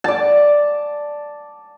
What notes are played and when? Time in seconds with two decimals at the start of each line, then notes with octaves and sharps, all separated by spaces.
0.04 D5 A5